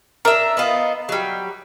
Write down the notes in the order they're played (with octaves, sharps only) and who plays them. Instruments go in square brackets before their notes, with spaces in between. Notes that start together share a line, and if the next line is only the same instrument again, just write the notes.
[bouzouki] D4 E5 [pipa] A#4
[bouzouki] B3 D#4 F4
F#3 G3